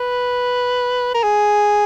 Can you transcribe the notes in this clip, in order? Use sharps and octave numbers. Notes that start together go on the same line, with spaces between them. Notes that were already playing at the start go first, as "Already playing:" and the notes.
Already playing: B4
A#4
G#4